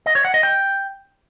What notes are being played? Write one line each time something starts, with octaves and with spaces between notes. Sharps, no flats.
D#5
C#5
F#5
D#5
G5